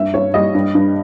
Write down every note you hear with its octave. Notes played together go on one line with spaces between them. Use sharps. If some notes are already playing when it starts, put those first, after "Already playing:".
Already playing: G2 E5
G2 C#5
G3 D#5
G2
G2